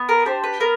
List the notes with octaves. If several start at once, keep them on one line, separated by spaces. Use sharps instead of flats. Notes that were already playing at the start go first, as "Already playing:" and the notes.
Already playing: B3
A#4
D4 G4 C5
B4
B3 A#4